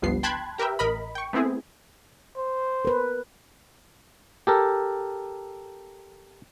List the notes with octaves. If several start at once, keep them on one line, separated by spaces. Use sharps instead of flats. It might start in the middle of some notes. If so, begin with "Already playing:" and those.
G1 C#2 G2 F3 B3 C7
G5 A5 B5 C6 F#6 G#6
G4 A#4 B4 E5 G5
A1 A#4 D#5 B5
G5 C#6
A3 B3 C4 E4 G#4
C5
A#4 B4
G4 A4 A#4